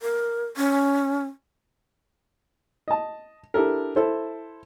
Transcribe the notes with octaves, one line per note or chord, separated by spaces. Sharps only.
A#4
C#4
D#5 A5
D4 E4 G4 A4 A#4
E4 A4 C5